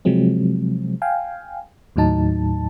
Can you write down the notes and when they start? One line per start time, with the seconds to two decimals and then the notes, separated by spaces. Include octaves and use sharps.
0.05 C3 F3 F#3 G#3 C4
1.02 F5 G5 G#5
1.96 D#2 A2 F#3 D#4 A5